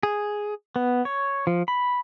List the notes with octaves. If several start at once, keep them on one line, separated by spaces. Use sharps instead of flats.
G#4
B3
C#5
F3
B5